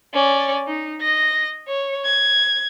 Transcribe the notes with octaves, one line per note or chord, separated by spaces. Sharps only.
C#4 D5
D#4
D#5 A#6
C#5
G#6